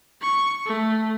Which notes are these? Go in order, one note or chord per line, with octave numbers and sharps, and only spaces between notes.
C#6
A3